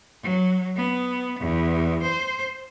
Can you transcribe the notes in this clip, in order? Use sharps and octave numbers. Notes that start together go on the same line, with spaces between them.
F#3
B3
E2
C5